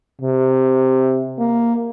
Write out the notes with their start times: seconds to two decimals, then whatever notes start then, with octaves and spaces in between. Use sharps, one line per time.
0.21 C3
1.39 A#3